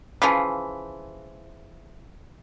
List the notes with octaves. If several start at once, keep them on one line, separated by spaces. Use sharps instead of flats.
C#3 E3 F3